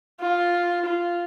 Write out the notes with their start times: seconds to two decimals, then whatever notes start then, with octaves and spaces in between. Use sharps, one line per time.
0.20 F4
0.85 F4